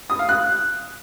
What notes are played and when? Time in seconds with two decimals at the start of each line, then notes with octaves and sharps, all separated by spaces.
0.10 D#6
0.19 F5
0.29 F#6